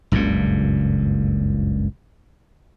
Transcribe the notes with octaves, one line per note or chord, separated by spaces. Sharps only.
F#1 C#2 G2 A#2